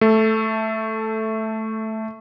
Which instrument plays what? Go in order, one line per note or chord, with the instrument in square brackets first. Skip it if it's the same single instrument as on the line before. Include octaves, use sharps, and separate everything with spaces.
[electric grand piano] A3 A4